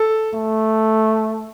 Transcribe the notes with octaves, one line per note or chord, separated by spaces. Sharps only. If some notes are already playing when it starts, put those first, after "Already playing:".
Already playing: A4
A3